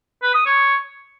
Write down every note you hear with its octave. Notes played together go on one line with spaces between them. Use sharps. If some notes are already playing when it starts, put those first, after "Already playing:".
B4
D#6
C#5